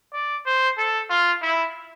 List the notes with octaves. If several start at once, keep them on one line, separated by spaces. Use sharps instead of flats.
D5
C5
A4
F4
E4